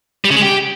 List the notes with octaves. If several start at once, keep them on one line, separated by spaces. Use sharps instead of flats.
G3
C#3
G#3
G4